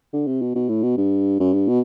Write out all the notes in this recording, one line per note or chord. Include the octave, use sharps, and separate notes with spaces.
D3
C3
B2
B2
A2
B2
G2
F#2
G2
B2